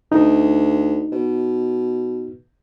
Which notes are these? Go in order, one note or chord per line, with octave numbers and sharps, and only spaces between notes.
D2 D#4
B2